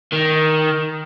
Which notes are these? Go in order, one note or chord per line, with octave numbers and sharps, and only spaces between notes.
D#3